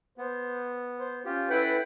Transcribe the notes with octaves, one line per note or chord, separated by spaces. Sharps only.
B3 C5
C5
C#4 F4 G4
E4 A4 B4 F#5 G5